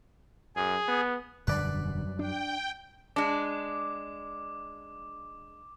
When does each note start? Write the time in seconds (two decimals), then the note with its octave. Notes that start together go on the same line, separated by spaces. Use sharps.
0.56 F#2 G#4
0.88 B3
1.47 E1 F#2 D3 G3 B4 D5 B5
2.19 D4 G5
3.16 G#3 D4 D6